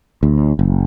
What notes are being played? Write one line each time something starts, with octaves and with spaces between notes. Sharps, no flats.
D2
F#1